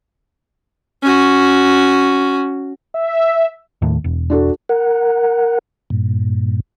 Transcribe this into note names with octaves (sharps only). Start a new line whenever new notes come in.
C#4 F#4
E5
D#2 A2
E1
D4 F#4 A4
A#4 F#5
G2 A#2